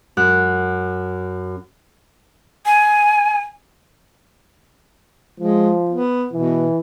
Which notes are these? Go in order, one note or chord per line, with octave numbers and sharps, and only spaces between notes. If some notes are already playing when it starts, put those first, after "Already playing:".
F#2 F#6
G#5
F3 G#3
B3
B2 E3